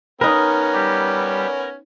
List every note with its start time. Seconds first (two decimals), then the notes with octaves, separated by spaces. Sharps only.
0.21 B3 C#4 D#4 A#4 B4
0.73 G3 G4